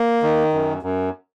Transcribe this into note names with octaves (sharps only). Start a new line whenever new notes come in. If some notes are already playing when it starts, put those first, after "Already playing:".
Already playing: A#3
D#3
F#2
F#2